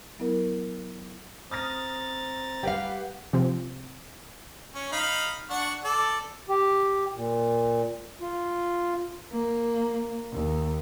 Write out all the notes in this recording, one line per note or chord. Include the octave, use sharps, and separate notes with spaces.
F#3 B3 E4 A#4
C4 A#5 D#6 F6 A6 A#6
G3 G4 B4 F5 F#5
C3 F3 C4
C#4
D#4 F5 B5
D4 F#5 C#6
A4 D5
G4
A#2
F4
A#3
D#2